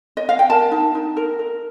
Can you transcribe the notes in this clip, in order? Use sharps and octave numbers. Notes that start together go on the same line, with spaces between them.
D#5
F5
G5
A#4 A5
D#4
D#4
A#4
A#4